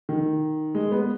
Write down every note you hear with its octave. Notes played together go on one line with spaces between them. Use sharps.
D#3
G#3
B3